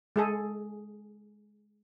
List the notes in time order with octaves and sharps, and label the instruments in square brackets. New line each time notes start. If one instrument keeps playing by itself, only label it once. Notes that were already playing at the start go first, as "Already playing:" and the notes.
[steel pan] G#3 G#4 A4